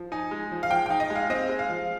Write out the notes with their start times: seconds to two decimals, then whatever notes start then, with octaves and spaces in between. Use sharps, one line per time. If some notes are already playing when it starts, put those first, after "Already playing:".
Already playing: F3
0.12 D#4 G#5
0.31 G#3
0.52 F3
0.63 F5
0.71 F3 G5
0.86 D#4 G5
1.00 D#5
1.10 G#3
1.15 F5
1.30 C4 D#5
1.49 G#3
1.59 F5
1.69 F3